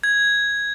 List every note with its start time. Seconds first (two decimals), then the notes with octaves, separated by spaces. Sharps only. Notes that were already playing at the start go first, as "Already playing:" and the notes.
0.03 G#6